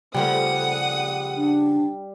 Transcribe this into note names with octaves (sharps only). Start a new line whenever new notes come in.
C#3 F3 G3 A3 F#5 D#6
D4